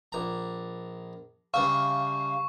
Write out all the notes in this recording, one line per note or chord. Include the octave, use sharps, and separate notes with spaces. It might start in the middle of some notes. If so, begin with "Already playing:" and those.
A#1 A#5
G2 C#3 E5 F5 C#6